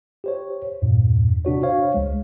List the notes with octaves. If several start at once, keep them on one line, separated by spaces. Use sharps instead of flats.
G4 C5 C#5
E2 G2 A#2
C3 D4 F#4 C#5
C5 C#5 F5
C#2 G#3